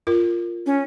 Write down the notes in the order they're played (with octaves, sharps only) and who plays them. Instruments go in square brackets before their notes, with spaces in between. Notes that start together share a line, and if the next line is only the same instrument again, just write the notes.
[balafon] F4 A#4
[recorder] C#4